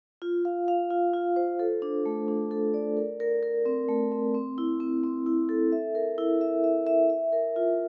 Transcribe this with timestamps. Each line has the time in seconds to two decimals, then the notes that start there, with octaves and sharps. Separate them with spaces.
0.22 F4
0.45 F5
0.68 F5
0.90 F4
1.13 F4
1.36 C5
1.59 A4
1.82 D4
2.06 A3
2.28 D4
2.51 A4
2.74 D5
2.97 A#4
3.20 A#4
3.43 A#4
3.66 C4
3.89 A3
4.12 C4
4.35 C4
4.58 E4
4.80 C4
5.03 C4
5.26 E4
5.49 A4
5.72 E5
5.95 A#4
6.18 E4
6.41 E5
6.64 E5
6.87 E5
7.10 E5
7.33 A#4
7.56 F4